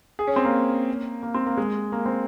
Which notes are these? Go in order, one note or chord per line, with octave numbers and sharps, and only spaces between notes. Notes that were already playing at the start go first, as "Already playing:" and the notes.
G#4
C#4
C4
A#3
A#3
C4
A#3
G#3
A#3
C4